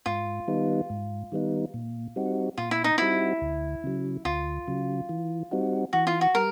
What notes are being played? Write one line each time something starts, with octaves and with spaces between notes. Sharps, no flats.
G#2 F4
D#3 G3 B3 D#4
G#2
D#3 G3 B3 D#4
A#2
G3 C4 D#4 F#4
A#2 F4
E4
D#4
G3 C4 D#4 E4 F#4
D2
C#3 F#3
D2 F4
C#3 F#3
E3
G3 C4 D#4 F#4
E3 F#4
F4
F#4
G3 A#4